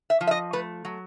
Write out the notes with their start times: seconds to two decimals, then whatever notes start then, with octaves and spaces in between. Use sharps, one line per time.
0.10 E5
0.21 F3
0.27 E5
0.31 D#5
0.53 A3 B4
0.85 F#3